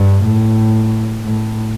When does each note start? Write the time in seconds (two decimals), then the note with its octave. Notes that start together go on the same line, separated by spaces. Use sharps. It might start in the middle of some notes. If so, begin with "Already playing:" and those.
Already playing: G2
0.24 A2
1.24 A2